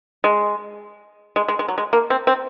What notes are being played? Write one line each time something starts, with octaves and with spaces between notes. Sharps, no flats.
G#3
G#3
G#3
G#3
F#3
G#3
A#3
C4
C4